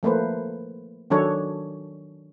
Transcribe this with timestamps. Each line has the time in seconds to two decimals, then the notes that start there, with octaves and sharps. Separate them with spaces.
0.03 F3 A3 A#3 B4 C5
1.10 D#3 F#3 D4 A4 C#5